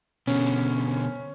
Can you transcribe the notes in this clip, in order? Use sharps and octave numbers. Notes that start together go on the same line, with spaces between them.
B2 D3 C#4